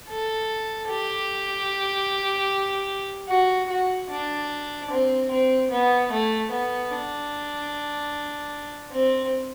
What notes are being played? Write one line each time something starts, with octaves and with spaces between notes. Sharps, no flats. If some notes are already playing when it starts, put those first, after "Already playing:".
A4
G4
F#4
F#4
D4
C4
C4
B3
A3
B3
D4
C4